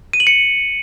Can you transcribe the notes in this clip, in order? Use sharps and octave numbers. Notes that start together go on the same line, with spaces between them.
D#7
F#7
C#7